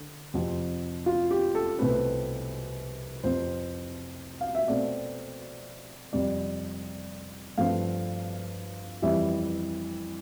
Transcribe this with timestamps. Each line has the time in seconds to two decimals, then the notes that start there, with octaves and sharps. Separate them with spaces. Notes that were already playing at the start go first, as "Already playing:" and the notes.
Already playing: D3
0.34 F2 C3 F3
1.06 F4
1.31 G4
1.55 A4
1.79 C2 B2 A3 C4 B4
3.24 F2 C3 F3 C5
4.41 F5
4.55 E5
4.68 B2 A3 C4 D5
6.13 F2 C3 G3 D5
7.58 G2 F3 A3 C4 F5
9.02 F2 E3 G3 E5